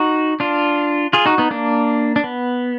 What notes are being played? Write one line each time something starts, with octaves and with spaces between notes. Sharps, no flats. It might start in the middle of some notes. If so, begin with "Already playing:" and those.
Already playing: D#4 F#4
D4 F4
F4 G#4
D#4 F#4
B3 D#4
A#3 D4
D4
B3